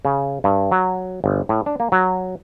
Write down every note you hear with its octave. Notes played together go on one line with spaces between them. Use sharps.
C#3
G2
F#3
G1
A2
D4
A#3
F#3